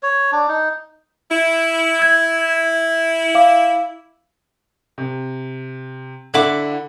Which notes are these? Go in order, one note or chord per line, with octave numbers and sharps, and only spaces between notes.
C#5
D4
D#4
E4
E6 G#6
F5 D6
C3
D3 E4 F#5 D6